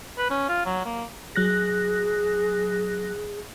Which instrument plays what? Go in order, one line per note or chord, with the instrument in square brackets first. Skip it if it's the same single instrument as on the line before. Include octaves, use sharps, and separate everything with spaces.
[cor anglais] B4
C#4
F4
F#3
A#3
[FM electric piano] F#3 F#6 A#6 [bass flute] G#4